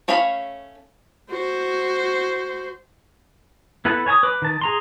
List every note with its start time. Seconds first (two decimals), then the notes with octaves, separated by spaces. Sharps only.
0.08 A3 C#4 C#5 F5 B5
1.30 F#4 C5
3.85 B3 E4 A4 B4
4.06 C#5 G#5 A5 D#6
4.23 B4 D6
4.42 D#3 A5
4.61 G#4 A#5 C6